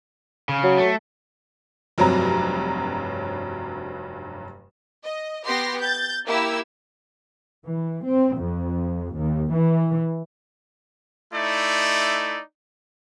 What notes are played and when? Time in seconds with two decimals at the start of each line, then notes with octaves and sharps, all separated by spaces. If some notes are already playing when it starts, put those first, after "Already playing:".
0.49 C#3
0.63 F#3
0.77 A3
1.98 F1 G2 F#3 C4 A#5
5.04 D#5
5.46 B3 G4 C6 A#6
5.80 G6 A6
6.26 A#3 E4 G4 E6 G#6
7.66 E3
8.06 C4
8.38 F2
9.16 D#2
9.52 E3
11.34 A3 D#4 E4 D5